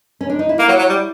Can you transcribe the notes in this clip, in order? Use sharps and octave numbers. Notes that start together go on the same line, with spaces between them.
C#4
D4
D#4
E4
A#3
F#3
F#3
G3